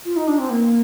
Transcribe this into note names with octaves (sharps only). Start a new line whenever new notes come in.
F4
D#4
D4
C4
A#3